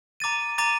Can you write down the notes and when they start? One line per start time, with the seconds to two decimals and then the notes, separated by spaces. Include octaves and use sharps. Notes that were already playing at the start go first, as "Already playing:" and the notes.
0.20 A#5 D6 A6 D#7
0.58 A#5 D6 A6 D#7